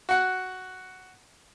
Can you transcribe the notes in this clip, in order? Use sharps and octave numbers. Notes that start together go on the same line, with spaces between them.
F#4 F#5